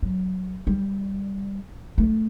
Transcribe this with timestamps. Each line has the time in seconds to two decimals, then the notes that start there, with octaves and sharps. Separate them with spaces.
0.02 F#3
0.67 G3
1.98 A3